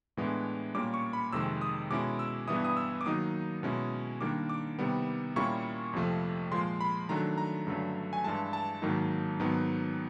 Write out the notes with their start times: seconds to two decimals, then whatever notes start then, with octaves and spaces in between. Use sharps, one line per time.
0.17 A2 E3 G#3 B3 D4
0.74 A#2 G3 A#3 C#4 D6
0.94 C#6
1.13 B5
1.32 F2 C3 D#3 G#3 E6
1.61 D#6
1.90 B2 G#3 C#4 E4 D6
2.19 E6
2.48 G2 E3 G3 B3 E4 D#6
2.65 D#6
2.77 E6
3.01 D6
3.06 D#3 F#3 A#3 D#4 D#6
3.63 B2 G#3 C#4 E4
4.21 D#3 G3 A#3 D4 D6
4.49 D6
4.79 C3 D#3 G3 B3
5.36 A#2 G3 A#3 C#4 E4 C#6
5.93 F2 C3 F3 A3
6.51 A#2 F3 G#3 C6
6.81 B5
7.09 D#3 F#3 A3 D4 A#5
7.38 A#5
7.67 G2 D3 F#3 A3 C#4
8.13 G#5
8.24 G2 E3 G#3 A5
8.53 A5
8.82 G#2 D#3 F#3 A#3 D#4
9.39 G#2 D#3 F#3 B3